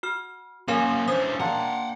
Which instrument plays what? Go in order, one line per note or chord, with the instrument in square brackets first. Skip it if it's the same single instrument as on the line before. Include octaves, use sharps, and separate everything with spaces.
[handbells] F#4 F6
[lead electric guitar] F#3 A#3 [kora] C#4 [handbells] A#4 F5 G#5 [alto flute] C6
[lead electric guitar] E3 D4 [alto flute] C5 [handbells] D#6
[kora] A#3 D4 [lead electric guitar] F5 F#5 [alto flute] C6